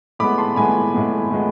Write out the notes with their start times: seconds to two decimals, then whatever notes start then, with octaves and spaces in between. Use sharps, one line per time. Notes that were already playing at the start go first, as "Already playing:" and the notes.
0.19 A2 G#3 B3 B5 D6
0.38 A5 C6
0.56 A2 G#3 B3 G#5 B5
0.94 A2 G#3 B3
1.31 A2 G#3 B3